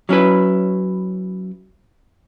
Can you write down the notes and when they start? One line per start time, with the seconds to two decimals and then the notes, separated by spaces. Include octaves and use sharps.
0.09 F#3 C#4 E4 B4